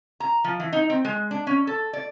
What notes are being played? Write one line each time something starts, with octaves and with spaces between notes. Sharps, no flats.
A#5
F3
E3
D#4
C4
G#3
D4
C#4
A4
D5